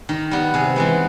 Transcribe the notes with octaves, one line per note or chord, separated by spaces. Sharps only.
D#3
G3 B3
C3 G#4
E3 G#3 B3